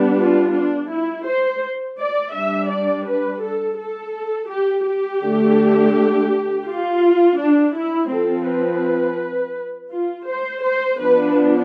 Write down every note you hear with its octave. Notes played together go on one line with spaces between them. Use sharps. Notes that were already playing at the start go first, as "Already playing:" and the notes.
Already playing: G3 B3 D4
F4
D4
E4
C5
D5
G3 D4 E5
D5
B4
A4
A4
G4
G4
D3 A3 D4
F4
D4
E4
F3 C4 A4
B4
F4
C5
C5
F3 B3 D4 B4